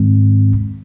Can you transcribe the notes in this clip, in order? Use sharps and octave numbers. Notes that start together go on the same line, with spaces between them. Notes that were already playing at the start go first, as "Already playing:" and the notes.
Already playing: G#2 D#3 G#3 C4